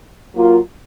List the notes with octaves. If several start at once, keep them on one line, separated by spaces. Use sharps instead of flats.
F#3 A#3 F4 A#4